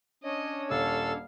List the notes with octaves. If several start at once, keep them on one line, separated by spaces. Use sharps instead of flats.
C#4 D4 C#5 D#5
D#1 A4 F5 E6